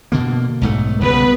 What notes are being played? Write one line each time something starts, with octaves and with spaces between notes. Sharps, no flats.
B2 D3 A#3
B1 G#2 A3
B1 C#3 G3 B3 B4